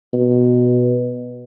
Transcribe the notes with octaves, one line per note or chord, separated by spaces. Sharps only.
B2